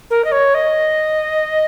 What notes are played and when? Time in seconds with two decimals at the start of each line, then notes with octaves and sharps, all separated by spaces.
0.10 A#4
0.25 D#5
0.32 C#5
0.54 D#5